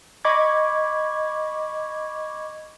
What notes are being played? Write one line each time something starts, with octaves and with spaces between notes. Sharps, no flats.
D#5 B5 C#6 D6 G#6